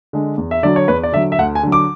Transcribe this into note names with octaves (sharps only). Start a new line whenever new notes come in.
D3 G#3
E2
E5
D3 F#3 D5
C#5
E2 B4
D5
D3 F#3 E5
E5
D2 F#5
G#5
D3 F#3
D6